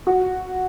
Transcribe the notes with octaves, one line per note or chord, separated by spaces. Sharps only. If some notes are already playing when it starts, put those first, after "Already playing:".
F#4